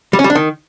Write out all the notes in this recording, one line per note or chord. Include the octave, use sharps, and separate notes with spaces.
G3
C#4
G3
D4
D#3